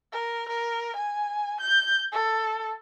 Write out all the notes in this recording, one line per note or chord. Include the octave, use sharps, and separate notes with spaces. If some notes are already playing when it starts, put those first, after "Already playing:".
A#4
A#4
G#5
G6
A4